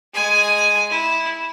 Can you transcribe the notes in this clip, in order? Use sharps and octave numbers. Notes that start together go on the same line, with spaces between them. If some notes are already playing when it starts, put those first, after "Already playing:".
G#3 G#5
E4